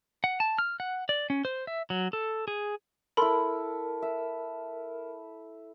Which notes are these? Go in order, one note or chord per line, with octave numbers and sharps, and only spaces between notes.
F#5
A5
F6
F#5
D5
C#4
C5
E5
F#3
A4
G#4
E4 A4 A#4 B5 C6
E5